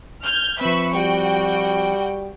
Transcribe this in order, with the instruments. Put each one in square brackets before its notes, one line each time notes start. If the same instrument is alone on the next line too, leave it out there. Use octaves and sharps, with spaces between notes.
[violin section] F6 G6 G#6
[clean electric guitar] F3 C4 [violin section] B4 E5 C#6
[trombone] G3 [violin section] F#4 G5